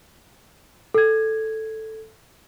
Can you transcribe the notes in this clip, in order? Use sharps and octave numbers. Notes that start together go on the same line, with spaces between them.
A4 G#6